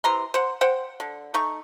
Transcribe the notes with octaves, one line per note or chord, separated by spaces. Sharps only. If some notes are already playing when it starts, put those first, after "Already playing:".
C3 E3 A#5 C6
C5 F#5
C5 F#5 G5
D3
A3 D#4 C#6